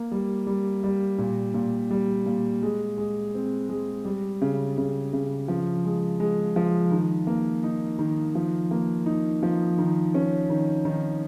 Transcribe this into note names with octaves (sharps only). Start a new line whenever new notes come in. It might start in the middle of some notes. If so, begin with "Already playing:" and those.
Already playing: A#3
G3
G3
G3
A#2
A#2
G3
A#2
G#3
G#3
C4
G#3
G3
C#3
C#3
C#3
F3
G#3
G#3
F3
D#3
A#3
D#4
D#3
F3
A#3
D#4
F3
D#3
C#4
D#3
D#3